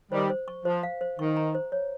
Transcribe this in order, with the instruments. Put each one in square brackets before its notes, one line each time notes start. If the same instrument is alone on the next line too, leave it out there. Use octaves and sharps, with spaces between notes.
[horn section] D#3 G3 [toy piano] C5
[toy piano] C5
C#6
[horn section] F3 [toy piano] C5
[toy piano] F5
C5
[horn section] D#3 [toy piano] C#6
[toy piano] A#5
C5
C#5